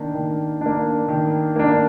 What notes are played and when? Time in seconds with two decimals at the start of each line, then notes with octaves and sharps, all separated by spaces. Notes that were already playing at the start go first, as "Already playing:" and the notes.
Already playing: D#3 A#3 D4
0.14 D#3
0.61 A#3 D4
1.09 D#3
1.56 A#3 D4